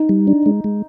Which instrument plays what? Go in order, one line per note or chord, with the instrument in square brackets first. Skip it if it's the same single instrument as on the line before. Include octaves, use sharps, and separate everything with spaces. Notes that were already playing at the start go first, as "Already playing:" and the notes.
Already playing: [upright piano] D#4
[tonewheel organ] G3
D4
G#3
G#3